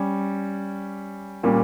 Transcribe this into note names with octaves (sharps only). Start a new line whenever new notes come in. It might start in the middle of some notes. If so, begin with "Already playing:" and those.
Already playing: G3 C#4
A#2 G3 A#3 C#4